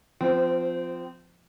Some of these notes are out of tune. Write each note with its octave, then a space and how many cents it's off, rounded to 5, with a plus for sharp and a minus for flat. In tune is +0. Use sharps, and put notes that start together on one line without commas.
F3 +0 C4 -25